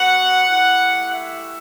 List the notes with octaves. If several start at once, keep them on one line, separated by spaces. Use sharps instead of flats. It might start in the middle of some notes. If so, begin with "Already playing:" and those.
Already playing: B3 F#4 F#5
A3 E4 G4
E5